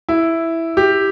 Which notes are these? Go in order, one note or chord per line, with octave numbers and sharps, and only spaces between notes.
E4
G4